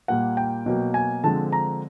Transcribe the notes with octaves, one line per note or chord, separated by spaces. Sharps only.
A#2 G3 A#3 F#5
G5
B2 F#3 A#3
G#5
D3 F3 G#3 C4 A5
A#5